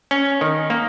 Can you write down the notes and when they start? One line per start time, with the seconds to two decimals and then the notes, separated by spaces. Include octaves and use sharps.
0.11 C#4
0.41 D#3
0.70 A#3